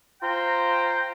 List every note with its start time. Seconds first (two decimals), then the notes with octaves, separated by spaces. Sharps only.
0.22 F4 C5 G5 A#5